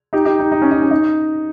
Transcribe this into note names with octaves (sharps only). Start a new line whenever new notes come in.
D#4 G4
D#4 G4
D#4
D#4
C#4
D#4
C#4
D#4